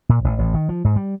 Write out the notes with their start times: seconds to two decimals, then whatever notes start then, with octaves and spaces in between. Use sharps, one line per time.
0.09 A#2
0.24 A1
0.39 A1
0.54 D#3
0.69 F3
0.84 G#2
0.96 G3